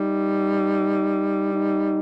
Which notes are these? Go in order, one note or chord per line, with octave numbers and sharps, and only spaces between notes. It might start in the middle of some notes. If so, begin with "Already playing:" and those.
Already playing: G3 D#4
D#4